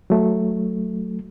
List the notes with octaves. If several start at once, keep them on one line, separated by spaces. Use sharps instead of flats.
F#3 A3